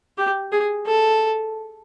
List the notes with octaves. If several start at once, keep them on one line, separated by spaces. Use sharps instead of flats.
G4
G#4
A4